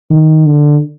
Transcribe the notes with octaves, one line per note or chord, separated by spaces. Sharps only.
D#3
D3